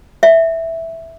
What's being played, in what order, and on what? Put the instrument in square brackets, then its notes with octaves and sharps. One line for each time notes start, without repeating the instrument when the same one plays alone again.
[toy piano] E5